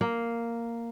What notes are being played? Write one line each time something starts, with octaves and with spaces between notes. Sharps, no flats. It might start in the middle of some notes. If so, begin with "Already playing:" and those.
A#3